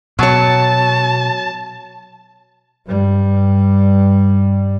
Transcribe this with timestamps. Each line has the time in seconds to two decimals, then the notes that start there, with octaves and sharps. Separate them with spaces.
0.19 B2 F#3 C#5 A5
2.87 G2 G3